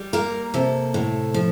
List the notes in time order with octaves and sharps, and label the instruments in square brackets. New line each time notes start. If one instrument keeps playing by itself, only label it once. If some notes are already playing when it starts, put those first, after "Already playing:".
Already playing: [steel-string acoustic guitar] G3
A#3 A#4
C3 A4
A2
F3